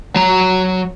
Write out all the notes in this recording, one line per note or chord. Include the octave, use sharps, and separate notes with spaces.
F#3 A#5